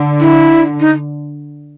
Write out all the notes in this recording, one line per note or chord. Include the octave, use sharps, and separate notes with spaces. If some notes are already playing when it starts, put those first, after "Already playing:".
Already playing: D3
E4
D#4